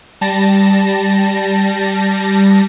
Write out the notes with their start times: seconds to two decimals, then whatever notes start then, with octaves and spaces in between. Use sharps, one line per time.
0.21 G3 A5 A#6